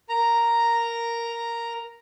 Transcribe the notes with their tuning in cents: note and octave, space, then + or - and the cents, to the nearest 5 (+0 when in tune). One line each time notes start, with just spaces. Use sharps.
A#4 +0 A#5 +0